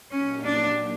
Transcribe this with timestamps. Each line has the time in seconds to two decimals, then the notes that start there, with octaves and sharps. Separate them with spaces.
0.11 A#2 F#3 A#3 C#4 D#4 G4
0.44 D4